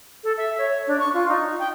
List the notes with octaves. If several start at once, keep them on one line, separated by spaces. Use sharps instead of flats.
A4
E5
C#5
D4
C#6
F4
D#4
G5